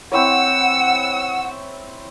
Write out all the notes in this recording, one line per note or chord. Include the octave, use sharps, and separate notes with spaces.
C4 E4 C#5 F#5 E6